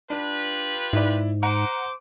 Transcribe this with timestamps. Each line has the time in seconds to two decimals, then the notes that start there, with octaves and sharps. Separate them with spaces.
0.10 D4 F4 G4 B4
0.93 G#2 E4 D5
1.43 C5 F#5 A#5 D6 D7